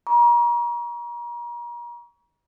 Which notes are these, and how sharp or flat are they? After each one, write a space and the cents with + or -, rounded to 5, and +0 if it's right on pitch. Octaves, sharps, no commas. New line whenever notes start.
A#5 +35 C#6 +35